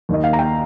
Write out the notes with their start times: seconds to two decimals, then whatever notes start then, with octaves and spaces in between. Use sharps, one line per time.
0.09 D#2 D#3 A#3 D#5
0.24 F5
0.33 A#5
0.39 G5